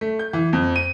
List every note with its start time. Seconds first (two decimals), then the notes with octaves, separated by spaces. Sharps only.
0.01 A3
0.19 G6
0.33 E3
0.53 F2
0.76 D#7